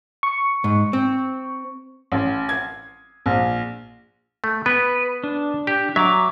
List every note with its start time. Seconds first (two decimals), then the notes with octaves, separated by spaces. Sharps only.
0.23 C#6
0.64 G#2
0.93 C4
2.12 A1
2.49 G#6
3.26 A#1
4.44 A3
4.66 B3 B4
5.24 D4
5.67 G4
5.96 F#3 E5 A#5 D6